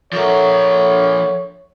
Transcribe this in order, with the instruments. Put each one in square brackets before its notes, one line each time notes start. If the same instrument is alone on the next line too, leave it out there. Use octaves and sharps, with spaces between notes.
[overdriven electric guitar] F3 A#4 [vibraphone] A4 E5 F#5 [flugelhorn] C#5